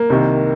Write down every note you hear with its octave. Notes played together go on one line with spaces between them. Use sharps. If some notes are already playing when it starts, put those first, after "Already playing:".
Already playing: A#3
C2 C3 D#3